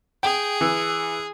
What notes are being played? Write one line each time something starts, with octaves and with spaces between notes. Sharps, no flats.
G#4 G5
E3